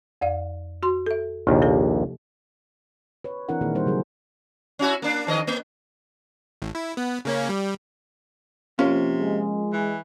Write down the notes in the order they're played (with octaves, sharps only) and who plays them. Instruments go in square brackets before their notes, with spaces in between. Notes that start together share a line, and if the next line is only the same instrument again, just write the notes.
[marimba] F2 D5 F5
F#4 C6
A4 E5
[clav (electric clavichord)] A#1 D#2 [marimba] C3 F3
[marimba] A#3 G4 A4
[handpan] B4 C#5
E3 C4 D4 E4 A#4 F#5
A#2 D#3 A#3 D#4 E4 G#4
G3 C5
C#3 F#3 G#4 A#4
[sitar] C#4 E4 F#4
A#3 D4
F2 D#3 D#5
A#3
[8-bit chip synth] A1
E4
B3
C#3 A#3 C#4
G3
[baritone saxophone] C3 [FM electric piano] F3 A#3 F4 [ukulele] C#4
[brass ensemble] G#3
[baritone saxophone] E3